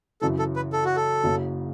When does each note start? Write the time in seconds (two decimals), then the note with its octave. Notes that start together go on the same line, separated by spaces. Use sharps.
0.21 F#2 C#3 E3 A4
0.39 A4
0.56 B4
0.73 A4
0.85 F#4
0.96 A4
1.24 F#1 F#2 C#3